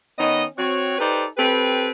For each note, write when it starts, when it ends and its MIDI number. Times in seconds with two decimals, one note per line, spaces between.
0.19 0.45 51
0.19 0.45 59
0.19 0.45 61
0.19 0.45 75
0.57 0.96 60
0.57 0.96 66
0.57 0.96 73
0.99 1.26 63
0.99 1.26 67
0.99 1.26 69
0.99 1.26 71
0.99 1.26 72
0.99 1.26 74
1.37 1.91 60
1.37 1.91 67
1.37 1.91 69
1.37 1.91 71